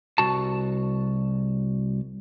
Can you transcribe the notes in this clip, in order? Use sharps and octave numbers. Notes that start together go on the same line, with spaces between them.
C2 F#4 A5